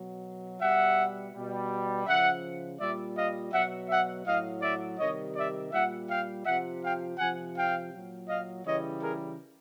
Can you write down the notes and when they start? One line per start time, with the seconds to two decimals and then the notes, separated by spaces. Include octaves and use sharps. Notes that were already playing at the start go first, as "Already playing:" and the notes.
Already playing: B2 F#3
0.60 B2 G3 E5 F#5
1.33 B2 G3
2.06 C#3 F3 E5 F#5
2.79 A#2 G3 D5 E5
3.15 D#5 F5
3.52 B2 F#3 E5 F#5
3.89 E5 F#5
4.25 A2 F#3 D#5 F5
4.62 D5 E5
4.99 C3 D#3 G3 C#5 D#5
5.36 D5 E5
5.72 A#2 G3 E5 F#5
6.09 F5 G5
6.45 C3 F3 E5 F#5
6.82 F5 G5
7.18 C3 F3 F#5 G#5
7.55 F5 G5
7.92 A#2 F#3
8.28 D#5 F5
8.65 C#3 E3 G3 C#5 D#5
9.01 G#4 A#4